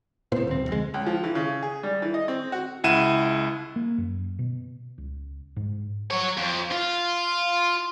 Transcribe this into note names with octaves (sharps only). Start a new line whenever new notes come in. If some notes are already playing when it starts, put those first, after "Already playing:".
A2 C3 B3 C5
D#1 D2 C4
F1 G#3
C#2
F3
E3
C#3
G#4
G3
E3
D#5
C4
F#4
C#2 E4 F#5 D#7 E7
A#3
F#2
B2
C#2
G#2
F#3 C#5
F2
F4